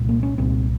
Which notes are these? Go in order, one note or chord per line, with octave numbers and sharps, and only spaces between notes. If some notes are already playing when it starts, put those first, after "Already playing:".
Already playing: C2 A#2
A#3
C#4
C2 A#2 C4